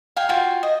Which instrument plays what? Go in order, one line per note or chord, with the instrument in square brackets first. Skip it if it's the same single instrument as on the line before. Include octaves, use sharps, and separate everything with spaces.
[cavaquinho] F5 G5 G#5
F4 F#4 G5 G#5
D#5